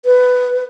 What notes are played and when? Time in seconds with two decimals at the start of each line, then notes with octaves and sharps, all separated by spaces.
0.05 B4